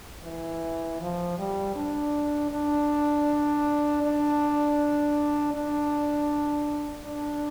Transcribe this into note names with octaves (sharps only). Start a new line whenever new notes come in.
E3
F3
G3
D4
D4
D4
D4
D4